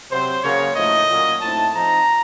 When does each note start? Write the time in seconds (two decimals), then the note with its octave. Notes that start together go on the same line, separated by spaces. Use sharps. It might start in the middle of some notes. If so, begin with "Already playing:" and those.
0.10 C3 F#3 C4 C5
0.43 C#3 F#3 A#3 C#5
0.76 A2 F3 A3 D#4 D#5
1.09 A#2 F#3 A#3 C#4
1.41 A2 A3 C4 D#4 A5
1.74 F3 C4 D#4 A#5